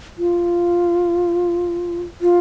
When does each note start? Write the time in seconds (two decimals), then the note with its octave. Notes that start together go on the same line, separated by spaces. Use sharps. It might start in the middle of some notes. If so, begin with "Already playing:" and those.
0.18 F4
2.21 F4